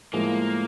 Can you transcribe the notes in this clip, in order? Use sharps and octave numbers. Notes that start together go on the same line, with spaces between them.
A2 F3 G#3 A#3